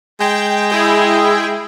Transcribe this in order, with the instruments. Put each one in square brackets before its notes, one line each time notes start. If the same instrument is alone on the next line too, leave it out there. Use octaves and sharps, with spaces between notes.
[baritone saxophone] G#3 [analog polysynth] G5
[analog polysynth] E4 G#4 G5